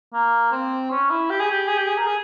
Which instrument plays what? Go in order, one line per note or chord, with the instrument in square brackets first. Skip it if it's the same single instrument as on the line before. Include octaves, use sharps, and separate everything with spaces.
[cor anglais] A#3
C4
C#4
E4
G4
G#4
G4
G#4
G4
G#4
A#4
G#4